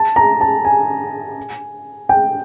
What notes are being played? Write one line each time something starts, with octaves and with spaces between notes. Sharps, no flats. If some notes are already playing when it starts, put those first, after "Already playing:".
Already playing: A5
A#5
A5
G#5
G5